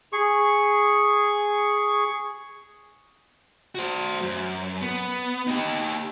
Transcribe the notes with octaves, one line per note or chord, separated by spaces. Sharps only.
G#4 C#6
F#4 C5
F#2
B3
D#4 G4